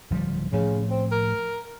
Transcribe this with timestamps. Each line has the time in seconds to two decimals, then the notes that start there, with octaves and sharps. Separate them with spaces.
0.11 D1 F3 G3
0.53 A2 C#3 F3
0.90 C4
1.12 A#4